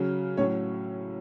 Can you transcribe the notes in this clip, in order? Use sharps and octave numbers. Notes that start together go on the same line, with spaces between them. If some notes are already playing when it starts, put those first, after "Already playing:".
Already playing: C#3 F#3
A2 F#3 C#4 C#5